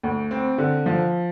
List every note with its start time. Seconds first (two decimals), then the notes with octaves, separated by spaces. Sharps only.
0.03 D2
0.31 C4
0.58 D3
0.86 F3